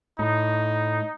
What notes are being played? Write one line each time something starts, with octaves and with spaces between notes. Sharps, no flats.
A2 D#4